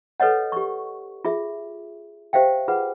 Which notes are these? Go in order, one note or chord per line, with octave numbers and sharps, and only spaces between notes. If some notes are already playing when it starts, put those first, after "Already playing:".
A4 B4 C#5 D#5 F#5
G4 C#6
F4 G#4 E5
G4 C5 E5 F5 G5
F4 G#4 B4 F#5